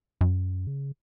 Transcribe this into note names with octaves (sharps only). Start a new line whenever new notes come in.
F#2
C#3